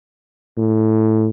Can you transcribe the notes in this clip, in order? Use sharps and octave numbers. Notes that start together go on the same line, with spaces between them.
A2